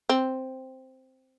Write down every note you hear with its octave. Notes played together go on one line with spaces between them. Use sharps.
C4